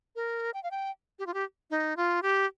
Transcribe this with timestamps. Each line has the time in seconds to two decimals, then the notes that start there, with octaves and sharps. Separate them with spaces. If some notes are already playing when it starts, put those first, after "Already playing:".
0.16 A#4
0.54 G5
0.63 F5
0.71 G5
1.19 G4
1.27 F4
1.34 G4
1.71 D#4
1.97 F4
2.23 G4